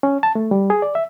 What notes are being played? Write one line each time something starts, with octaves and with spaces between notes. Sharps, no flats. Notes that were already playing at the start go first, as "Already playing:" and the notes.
C#4
A5
A3
G3
G#4
D5
E5